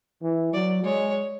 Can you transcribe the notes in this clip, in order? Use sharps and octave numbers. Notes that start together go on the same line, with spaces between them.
E3
F#3 D5
G#3 C#5